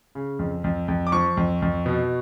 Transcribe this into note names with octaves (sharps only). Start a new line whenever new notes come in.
C#3
F2
F2
F2
D6
F3 C#6
F2
F2
B2